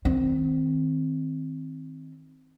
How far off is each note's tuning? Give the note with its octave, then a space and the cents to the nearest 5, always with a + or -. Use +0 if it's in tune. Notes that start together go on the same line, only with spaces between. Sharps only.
D#3 +15 C4 +0